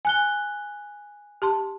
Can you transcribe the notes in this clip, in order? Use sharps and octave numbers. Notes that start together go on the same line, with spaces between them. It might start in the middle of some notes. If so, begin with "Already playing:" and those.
G#5 F#6 G7
G4 A5 C6